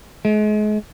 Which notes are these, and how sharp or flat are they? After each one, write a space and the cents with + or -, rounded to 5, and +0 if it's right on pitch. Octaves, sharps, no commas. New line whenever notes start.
G#3 +35